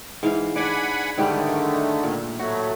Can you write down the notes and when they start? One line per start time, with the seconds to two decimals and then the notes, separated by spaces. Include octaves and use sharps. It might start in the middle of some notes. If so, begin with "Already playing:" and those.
0.23 G#2 E3 F5
0.56 D4 D5 F#5 G#5 B5
1.17 G#2 D3 D#3 G3 A3 G4
2.03 A#2
2.39 A2 F#3 A3 F#4